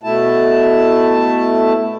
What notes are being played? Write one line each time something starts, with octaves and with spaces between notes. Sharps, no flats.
B2 A3 E4 A5